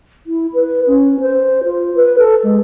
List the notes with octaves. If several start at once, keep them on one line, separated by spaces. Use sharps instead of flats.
E4
B4
C#4
C5
F4
B4
A4
G#3